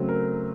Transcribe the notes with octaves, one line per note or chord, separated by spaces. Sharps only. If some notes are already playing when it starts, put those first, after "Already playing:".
Already playing: C#3 F#3 A3 C4
A#4